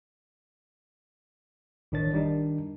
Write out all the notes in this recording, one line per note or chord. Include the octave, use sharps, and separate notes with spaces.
A1 D#3 D4 C#5 A6
D#3 G3 D4 D#4